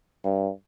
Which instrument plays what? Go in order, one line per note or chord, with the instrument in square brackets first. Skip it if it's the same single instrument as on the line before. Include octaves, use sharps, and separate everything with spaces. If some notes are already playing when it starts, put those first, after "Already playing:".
[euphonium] G2